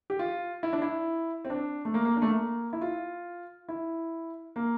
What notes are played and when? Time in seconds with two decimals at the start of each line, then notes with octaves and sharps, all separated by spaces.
0.10 G4
0.19 F4
0.63 E4
0.73 D4
0.82 E4
1.45 C4
1.50 D4
1.85 A3
1.94 A#3
2.05 A#3
2.16 D4
2.22 A3
2.27 A#3
2.73 E4
2.81 F4
3.69 E4
4.56 A#3